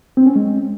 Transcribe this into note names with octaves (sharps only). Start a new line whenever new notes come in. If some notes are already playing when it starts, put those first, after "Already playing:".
C4
C#4
G#3